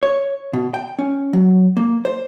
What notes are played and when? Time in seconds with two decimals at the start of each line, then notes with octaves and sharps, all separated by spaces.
0.03 C#5
0.53 B2
0.74 G5
0.99 C#4
1.33 F#3
1.77 A#3
2.05 C5